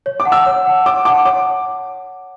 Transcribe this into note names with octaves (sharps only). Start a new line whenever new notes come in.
C#5
D6
F#5 A5
E6
C#5
F#5 A5
C#5 D6
F#5 A5 D6
C#5 D6